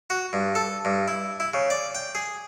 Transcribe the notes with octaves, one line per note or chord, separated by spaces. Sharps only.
F#4
G2
A4
G2
E4
E4
C#3
D5
G5
G#4